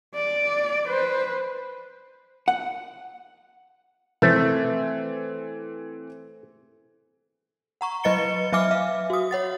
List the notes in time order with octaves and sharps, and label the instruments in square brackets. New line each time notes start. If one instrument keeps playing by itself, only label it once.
[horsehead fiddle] D5
B4 C5
[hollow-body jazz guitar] F#5
[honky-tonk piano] E3 C4 [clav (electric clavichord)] A3
[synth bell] F#5 A#5 C#6
F#3 B4 D#5 A6 C#7 G7
F#3 E5 G#5 D6 F6
E5 F5
F#4 D#6
C#5 F#5 A6